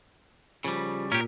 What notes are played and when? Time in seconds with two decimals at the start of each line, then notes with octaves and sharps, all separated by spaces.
0.64 C#3 F3 G3
1.12 A#2 C#4 G4 A#4